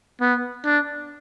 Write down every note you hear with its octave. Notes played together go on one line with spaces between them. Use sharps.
B3
D4